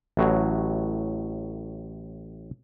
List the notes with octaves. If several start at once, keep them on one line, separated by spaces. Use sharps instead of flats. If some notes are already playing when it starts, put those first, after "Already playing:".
A1 A2 F#3